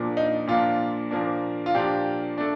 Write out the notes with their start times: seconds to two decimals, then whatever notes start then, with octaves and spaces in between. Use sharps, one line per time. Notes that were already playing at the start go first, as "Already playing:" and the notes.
Already playing: A#2 F3 A#3 D4
0.17 D#4
0.47 A#2 F3 A#3 D4 F4
1.11 A#2 F3 A#3 D4
1.66 F4
1.75 A#2 F3 A#3 D4 G4
2.38 A3 D4